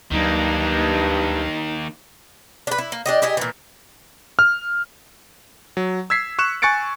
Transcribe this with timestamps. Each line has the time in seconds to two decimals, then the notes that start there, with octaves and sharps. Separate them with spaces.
0.11 D2 G2 D#3 F#3 A#3 D#4
2.67 D4 B4
2.78 E4
2.92 A#3
3.06 D4 G4 D#5
3.22 E4 G4 G#4 D#5
3.37 A#2 E3
4.39 F6
5.77 F#3
6.10 E6 G#6 B6 C7
6.39 C#6 F#6 E7
6.62 G#5 C#6 F#6 A6 C#7 D7